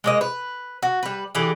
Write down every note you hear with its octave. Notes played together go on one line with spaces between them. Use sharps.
G#3 A#3 D#5
B4
F#4
G3 B4
D3 E3 G4 G#4